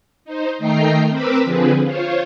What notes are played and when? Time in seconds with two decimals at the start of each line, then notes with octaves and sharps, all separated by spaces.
0.25 D#4 C5
0.58 D#3 A3 D#4 G5 A#5 C7
1.09 C4 A#4 B4 B5 D6 E6
1.43 D3 F3 C4 G#4 B4
1.83 F4 C5 C#5